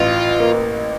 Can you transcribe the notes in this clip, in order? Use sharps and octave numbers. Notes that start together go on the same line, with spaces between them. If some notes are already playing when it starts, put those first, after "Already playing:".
Already playing: A1 F4
A#3